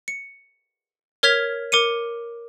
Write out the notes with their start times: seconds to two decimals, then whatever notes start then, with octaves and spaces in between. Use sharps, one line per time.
0.08 C#7
1.23 A#4 C#5 F6 G#6 B6 F7
1.72 A#4 D6 C#7 D#7